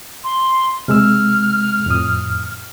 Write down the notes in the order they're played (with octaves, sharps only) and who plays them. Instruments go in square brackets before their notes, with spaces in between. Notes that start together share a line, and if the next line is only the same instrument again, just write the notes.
[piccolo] C6
[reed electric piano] C3 G#3 E6 [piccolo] F6
[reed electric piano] F2 A2 D#6